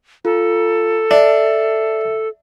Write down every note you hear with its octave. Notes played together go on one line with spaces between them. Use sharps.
F4 A4
D4 E5